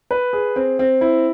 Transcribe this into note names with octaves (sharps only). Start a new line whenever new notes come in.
B4
G#4
C4
C4
E4